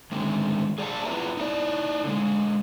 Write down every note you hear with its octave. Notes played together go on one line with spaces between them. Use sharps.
D3 D#3 G#3
G#4 D5 F5 G5 A5
B3 E4 F4 B4 E5 A#5
D#4 E4 A4 D5
D3 G#3